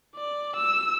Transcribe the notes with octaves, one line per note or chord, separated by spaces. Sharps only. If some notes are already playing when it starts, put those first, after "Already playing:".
D5
E6